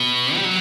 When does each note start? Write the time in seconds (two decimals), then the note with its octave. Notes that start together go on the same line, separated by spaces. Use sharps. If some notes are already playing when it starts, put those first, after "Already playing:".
Already playing: B2
0.35 G3
0.44 F#3